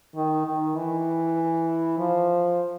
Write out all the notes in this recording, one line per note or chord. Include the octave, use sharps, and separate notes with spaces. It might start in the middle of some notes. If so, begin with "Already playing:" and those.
D#3
D#3
E3
F3